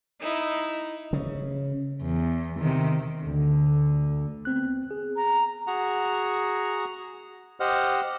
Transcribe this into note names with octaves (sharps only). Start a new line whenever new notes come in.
D#4 E4
C#3
E2
C3 D#3
D2 D3
B3 C4 F#6
G#4
A#5
F#4 G#4 F#5 A#5
G4 C5 D#5 F#5 F6